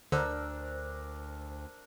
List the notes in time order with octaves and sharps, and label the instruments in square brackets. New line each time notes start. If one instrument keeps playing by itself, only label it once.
[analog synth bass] D2 [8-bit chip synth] D3 [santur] D4 A#4 [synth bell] C5 E6